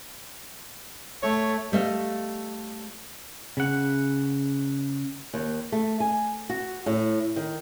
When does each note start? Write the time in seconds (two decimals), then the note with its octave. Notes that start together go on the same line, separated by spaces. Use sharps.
1.23 A3 C#5
1.72 G3 A3 D#5 F5
3.57 C#3 F#5
5.34 D#2
5.72 A3
6.00 G#5
6.49 F#4
6.86 A2
7.36 D#3